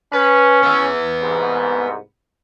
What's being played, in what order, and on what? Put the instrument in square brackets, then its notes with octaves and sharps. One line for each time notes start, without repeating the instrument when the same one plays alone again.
[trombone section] C#4 [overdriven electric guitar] B4
[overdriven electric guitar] B3 E5
[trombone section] C2 G#2